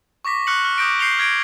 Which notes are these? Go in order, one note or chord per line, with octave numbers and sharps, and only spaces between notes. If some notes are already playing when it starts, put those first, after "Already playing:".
C#6 D6 A#6 B6
C#6 F6 F#6 C#7 F#7
F6
D6 D#6 G6 A#6 D7
G6 C7 C#7 F7 G7
F6 G#6 A#6 D7